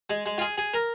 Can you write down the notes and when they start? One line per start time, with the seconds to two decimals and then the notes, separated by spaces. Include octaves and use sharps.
0.10 G#3
0.26 G#3
0.38 F4
0.41 G#4
0.58 G#4
0.74 A#4